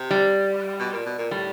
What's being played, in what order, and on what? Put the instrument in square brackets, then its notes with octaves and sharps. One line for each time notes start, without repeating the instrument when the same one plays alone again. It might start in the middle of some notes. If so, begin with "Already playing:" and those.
Already playing: [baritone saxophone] C3
[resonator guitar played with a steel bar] G3
[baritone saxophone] B2
A#2
B2
A#2
[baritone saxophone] A2 [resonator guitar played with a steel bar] G3